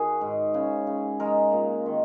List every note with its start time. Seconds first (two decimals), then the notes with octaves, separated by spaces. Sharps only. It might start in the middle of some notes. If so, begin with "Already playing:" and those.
Already playing: D#3 F#4 G#4
0.21 G#2
0.54 C#3
0.87 C#3
1.20 G#3 A#4
1.52 A#2
1.86 D#3